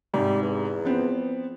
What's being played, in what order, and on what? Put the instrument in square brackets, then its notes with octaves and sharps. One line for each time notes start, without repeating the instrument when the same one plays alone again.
[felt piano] G#2 C3 [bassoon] G3
[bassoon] E2
[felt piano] F3 B3 C4